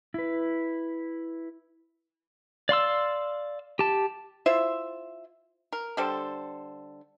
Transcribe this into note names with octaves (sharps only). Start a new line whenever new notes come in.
E4 B4
D5 F5 C6 E6
G4 A5
E4 F4 C5 E5
A#4
D3 G3 A4 C5